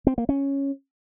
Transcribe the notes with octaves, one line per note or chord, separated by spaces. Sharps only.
C4
A#3
C#4